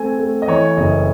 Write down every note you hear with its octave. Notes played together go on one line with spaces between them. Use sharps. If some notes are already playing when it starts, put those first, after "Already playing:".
Already playing: A3 C4 G#5
A3
D#5
E3 C#5
F#1 D#5